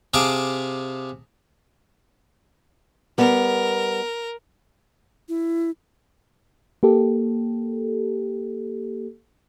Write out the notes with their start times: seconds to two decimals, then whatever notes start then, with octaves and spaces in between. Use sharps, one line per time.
0.14 C3 G#4 F5 G#5 A5 D6
3.18 G3 B3 A#4
5.29 E4
6.83 A#3 G4 A4